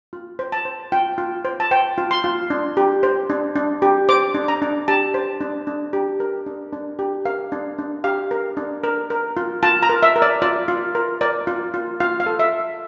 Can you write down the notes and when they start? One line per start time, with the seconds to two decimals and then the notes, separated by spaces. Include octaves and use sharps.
0.13 F4
0.39 C5
0.52 A5
0.65 C5
0.92 F4 G5
1.18 F4
1.45 C5
1.60 A5
1.71 C5 G5
1.98 F4
2.11 C6
2.24 F4
2.50 D4
2.77 G4
3.03 C5
3.30 D4
3.56 D4
3.82 G4
4.09 C5 D6
4.34 D4
4.48 A#5
4.62 D4
4.88 G4 A5
5.14 C5
5.41 D4
5.67 D4
5.93 G4
6.20 A#4
6.46 D4
6.73 D4
6.99 G4
7.25 A#4 F5
7.52 D4
7.78 D4
8.04 G4 F5
8.31 A#4
8.57 D4
8.84 A#4
9.10 A#4
9.37 F4
9.63 F4 A5
9.83 A#5
9.89 A#4
10.03 E5
10.16 A#4
10.22 D5
10.42 F4 D5
10.68 F4
10.95 A#4
11.21 A#4 D5
11.47 F4
11.74 F4
12.00 F4 F5
12.20 F5
12.26 A4
12.39 E5